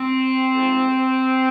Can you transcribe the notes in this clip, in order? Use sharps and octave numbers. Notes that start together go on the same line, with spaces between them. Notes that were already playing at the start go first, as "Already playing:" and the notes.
Already playing: C4
G#2 F3 A3